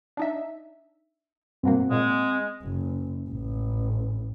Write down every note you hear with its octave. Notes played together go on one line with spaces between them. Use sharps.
D4 D#4 E5
G2 B2 A#3 C4 F#5
A#2 G#3
F#1
A1